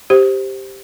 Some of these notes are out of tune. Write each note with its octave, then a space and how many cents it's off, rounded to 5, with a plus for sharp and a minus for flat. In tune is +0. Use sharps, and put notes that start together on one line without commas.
G4 +0 C5 +0